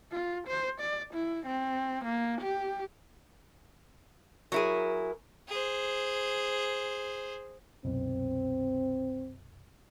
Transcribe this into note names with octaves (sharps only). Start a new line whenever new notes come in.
F4
C5
D5
E4
C4
A#3
G4
F#3 E4 G#4 A#4
G#4 C5
C2 F#2 B2 C4